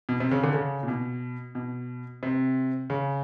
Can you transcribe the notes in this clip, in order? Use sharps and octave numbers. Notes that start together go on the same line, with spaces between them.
B2
C3
C#3
D3
C#3
A#2
B2
B2
C3
C#3